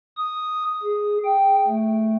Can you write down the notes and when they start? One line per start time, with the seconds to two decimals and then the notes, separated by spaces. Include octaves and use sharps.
0.17 D#6
0.83 G#4
1.25 G5
1.68 A3